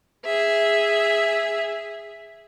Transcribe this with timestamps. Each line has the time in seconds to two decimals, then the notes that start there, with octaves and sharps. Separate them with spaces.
0.25 G#4 E5